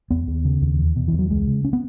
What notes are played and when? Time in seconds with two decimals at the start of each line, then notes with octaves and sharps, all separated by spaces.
0.11 E2 B3
0.28 D#2
0.45 C#3
0.62 D#2
0.79 E2
0.96 B2
1.08 E2 E3
1.19 F#3
1.30 C#2 G#3
1.47 C#3
1.64 C#4
1.73 B3